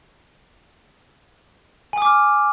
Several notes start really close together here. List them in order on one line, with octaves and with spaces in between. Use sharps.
G#5 D#6 D6 F6